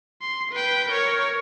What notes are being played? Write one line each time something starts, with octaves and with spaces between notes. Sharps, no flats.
C6
B4 G5
A#4 C#5